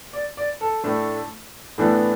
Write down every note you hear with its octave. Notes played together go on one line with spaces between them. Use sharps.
D5
D5
A4
A2 A3 D4
A2 E3 B3 D4